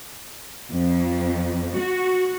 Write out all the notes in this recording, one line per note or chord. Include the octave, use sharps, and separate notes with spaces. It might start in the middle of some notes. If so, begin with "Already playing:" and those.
F2
F#4